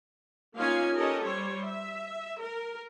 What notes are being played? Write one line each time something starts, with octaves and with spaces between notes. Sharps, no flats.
A#3 C#4 D#4 F4 F5 G#5
C#4 G4 A4 A#4 D#5
G3 C5 C#5
E5
A#4